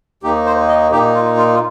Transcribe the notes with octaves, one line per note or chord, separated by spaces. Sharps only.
D#2 D#3 A#3 D#4 G4
C5
D#5
A#2 A#3 D#4 G4
F4
F4
F4